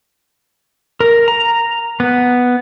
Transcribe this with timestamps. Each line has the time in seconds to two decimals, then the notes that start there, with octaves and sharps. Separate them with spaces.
1.00 A#4
1.28 A#5
2.00 B3